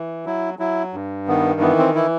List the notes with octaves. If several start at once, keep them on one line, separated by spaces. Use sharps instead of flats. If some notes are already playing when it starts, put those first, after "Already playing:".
Already playing: E3
F#3 E4
F#3 E4
G2
D#3 B3
E3 B3
C4
E3 E4